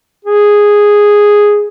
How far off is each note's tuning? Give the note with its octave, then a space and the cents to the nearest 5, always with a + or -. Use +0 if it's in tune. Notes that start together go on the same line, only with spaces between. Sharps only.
G#4 -5